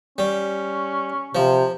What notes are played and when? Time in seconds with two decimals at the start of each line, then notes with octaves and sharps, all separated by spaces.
0.18 G3 C#4
1.35 C3 F3